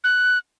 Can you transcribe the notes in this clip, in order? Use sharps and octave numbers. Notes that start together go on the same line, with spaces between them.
F#6